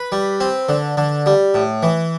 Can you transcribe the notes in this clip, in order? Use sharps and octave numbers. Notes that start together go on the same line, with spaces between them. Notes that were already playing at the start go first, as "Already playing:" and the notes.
Already playing: B4
G3
C4
D3
D3
G3
A2
E3